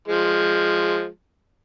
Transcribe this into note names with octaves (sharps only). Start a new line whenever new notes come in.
F3 G#3